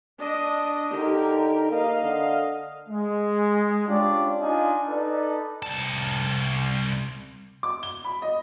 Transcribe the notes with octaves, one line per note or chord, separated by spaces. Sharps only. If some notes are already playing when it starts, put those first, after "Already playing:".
D4 D#5
D3 D#4 G4 A#4
A#3 D#5 F5
D3
G#3
C#4 D4 F4 G4 D5
D4 D#4 F4 D#5 G#5
D#4 A4 B4 D5
C2 A5
D6
G7
B5
D#5